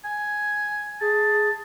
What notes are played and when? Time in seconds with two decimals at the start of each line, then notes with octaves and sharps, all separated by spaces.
0.05 G#5
1.01 G#4 A5